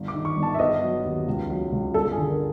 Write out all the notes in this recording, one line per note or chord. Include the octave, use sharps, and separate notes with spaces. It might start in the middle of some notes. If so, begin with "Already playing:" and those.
Already playing: G1
D6
D#3
C#6
G1
A5
E5
B3 D#5
F#3
D#2
C#2
F#3
C#2
G1 A4
G#4
D3
A#4